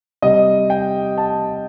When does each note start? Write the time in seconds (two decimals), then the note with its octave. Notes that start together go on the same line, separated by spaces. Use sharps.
0.22 C3 G3 D#5
0.70 G5
1.18 A5